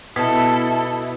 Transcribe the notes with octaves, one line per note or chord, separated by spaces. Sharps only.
B2 E4 A4 D#6 G#6 B6